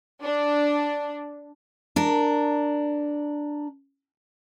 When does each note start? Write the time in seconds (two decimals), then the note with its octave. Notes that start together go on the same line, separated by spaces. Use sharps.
0.22 D4
1.96 D4 A#4